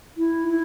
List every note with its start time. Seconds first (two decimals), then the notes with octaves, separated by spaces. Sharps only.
0.17 E4
0.48 E4